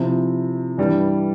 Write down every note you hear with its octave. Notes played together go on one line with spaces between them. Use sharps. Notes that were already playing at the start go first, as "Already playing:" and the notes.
Already playing: C3 F3 C4 E4
G2 E3 G3